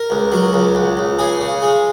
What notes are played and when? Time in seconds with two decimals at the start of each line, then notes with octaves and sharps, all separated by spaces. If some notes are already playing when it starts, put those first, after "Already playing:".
Already playing: A#4
0.10 C#2
0.32 F#3
0.53 C#2
0.75 C#2
0.97 C#2
1.19 C#3 G#4
1.40 C#3
1.62 G#3